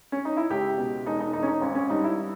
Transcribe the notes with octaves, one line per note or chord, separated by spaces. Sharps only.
C#4
D#4
E4
C#2 G4
B2
E1 D#4
D#4
E2 D#4
C#4
D#4
G#1 C#4
C#4
G2 D#4
E4